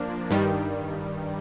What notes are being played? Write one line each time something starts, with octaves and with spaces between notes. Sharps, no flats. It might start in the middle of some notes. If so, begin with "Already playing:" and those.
Already playing: F3 A#3 D4
G2 D#3 G3